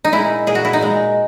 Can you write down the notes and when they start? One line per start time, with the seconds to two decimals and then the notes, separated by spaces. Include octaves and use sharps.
0.05 D#4
0.12 A#2 G#3 E4
0.47 A#2 G#3 G#4
0.55 F#4
0.65 E4
0.73 D#4
0.81 A#2 G#3